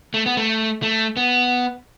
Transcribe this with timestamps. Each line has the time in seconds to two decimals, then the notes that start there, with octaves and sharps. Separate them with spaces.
0.14 A3
0.26 B3
0.37 A3
0.83 A3
1.17 B3